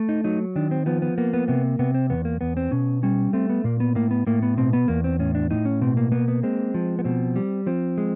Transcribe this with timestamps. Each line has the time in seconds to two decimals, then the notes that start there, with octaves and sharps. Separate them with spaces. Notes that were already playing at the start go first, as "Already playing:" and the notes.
Already playing: A3
0.09 D#4
0.24 F#3 D#4
0.56 D#3 D4
0.71 C4
0.86 F3 B3
1.02 B3
1.18 A#3 B3
1.33 B3
1.48 C3 B3
1.79 C3 B3
1.94 C4
2.10 E2 B3
2.25 A#3
2.41 E2 B3
2.57 C4
2.71 B2 C#4
3.03 G3 C#4
3.33 A3 C4
3.49 B3
3.64 A#2 A#3
3.80 B3
3.95 A2 A#3
4.11 B3
4.27 A2 A#3
4.42 B3
4.57 B2 C4
4.73 B3
4.88 E2 A#3
5.04 C4
5.19 A2 C#4
5.35 D4
5.51 A2 D#4
5.65 C#4
5.81 B2 C4
5.97 A#3
6.12 A#3 B3
6.28 B3
6.43 G#3 C4
6.74 F3
6.99 B3
7.04 B2 C4
7.36 G3
7.66 F3 C4
7.98 G#3